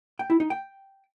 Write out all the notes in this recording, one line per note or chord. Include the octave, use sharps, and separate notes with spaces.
G5
E4
D#4
G5